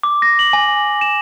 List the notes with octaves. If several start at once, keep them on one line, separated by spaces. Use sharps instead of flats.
D6
A#6
F#7
G#5
E7